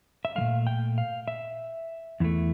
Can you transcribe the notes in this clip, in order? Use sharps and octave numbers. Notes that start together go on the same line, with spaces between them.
E5
F3 A3 F5
A#2
G5
F5
E5
E2 E3 A3